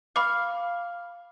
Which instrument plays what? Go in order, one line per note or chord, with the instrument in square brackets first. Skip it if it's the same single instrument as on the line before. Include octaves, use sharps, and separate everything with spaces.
[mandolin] F5 [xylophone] B5 D6